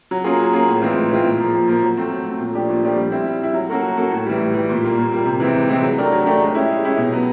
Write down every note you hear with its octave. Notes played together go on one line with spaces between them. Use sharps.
F#3
A#3 C#4 F4 G#4
F#3
A#3 C#4 F4 G#4
A2
E3 G#3 C4 F4
A2
E3 G#3 C4 F4
A#2
F3 A#3
A#2
F3 A#3
F#3
A3 C4
F#3
A3 C4
A#2
F3 A3 D4 G4
A#2
F3 A3 D4 G4
G3
C4 E4
G3
C4 E4
F#3
A#3 C#4 F#4 A4
F#3
A#3 C#4 F#4 A4
A2
E3 G3
A2
E3 G3
A#2
G3 A#3
A#2
G3 A#3
C3
E3 G#3 C4
C3
E3 G#3 C4
F#3
A3 D4 G4 A#4
F#3
A3 D4 G4 A#4
G#3
C#4 E4 G4
G#3
C#4 E4 G4
B2
F#3 B3